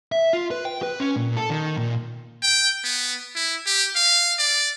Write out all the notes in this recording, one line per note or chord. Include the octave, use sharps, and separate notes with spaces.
E5
F4
B4
G5
B4
C#4
A#2
A4
D#3
A#2
G5
B3
E4
G4
F5
D5